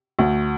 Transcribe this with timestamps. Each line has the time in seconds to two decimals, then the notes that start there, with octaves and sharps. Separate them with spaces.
0.19 D2